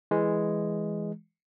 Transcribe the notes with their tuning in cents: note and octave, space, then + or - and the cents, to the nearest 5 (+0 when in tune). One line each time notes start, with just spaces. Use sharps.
E3 +0 G#3 +0